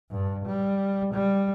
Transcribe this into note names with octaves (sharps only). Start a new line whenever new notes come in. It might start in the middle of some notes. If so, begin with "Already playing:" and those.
G2
G3
G3